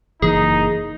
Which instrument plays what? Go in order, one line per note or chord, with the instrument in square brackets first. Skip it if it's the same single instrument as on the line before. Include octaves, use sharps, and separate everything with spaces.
[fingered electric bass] F#1 E3 A#3 [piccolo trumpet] D#4 [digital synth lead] G#4